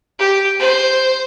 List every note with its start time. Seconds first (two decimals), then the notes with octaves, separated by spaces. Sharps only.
0.19 G4
0.59 C5